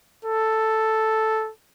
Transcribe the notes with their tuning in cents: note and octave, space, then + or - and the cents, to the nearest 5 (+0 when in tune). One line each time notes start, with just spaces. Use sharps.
A4 +0